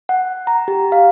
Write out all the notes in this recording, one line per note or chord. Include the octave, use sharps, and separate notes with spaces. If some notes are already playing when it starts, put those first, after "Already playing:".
F#5
A#5
G4
F5